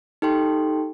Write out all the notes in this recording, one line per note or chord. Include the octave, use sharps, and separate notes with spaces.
D#4 G4 A4 G5 C6